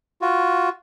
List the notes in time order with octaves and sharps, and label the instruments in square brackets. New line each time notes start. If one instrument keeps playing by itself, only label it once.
[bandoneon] F4 F#4